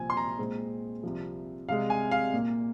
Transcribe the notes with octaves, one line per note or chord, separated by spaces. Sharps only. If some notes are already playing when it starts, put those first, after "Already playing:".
Already playing: C2 A#2 F3 C4 G#5
C6
A#5
A#2 G#3 C4
C2 C3 F3
C2 C3 G#3 F5
G#5
F5
A#2 A#3